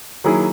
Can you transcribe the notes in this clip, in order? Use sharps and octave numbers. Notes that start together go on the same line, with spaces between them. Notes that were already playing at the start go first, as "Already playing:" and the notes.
D#3 F#3 A#3 E4 G#4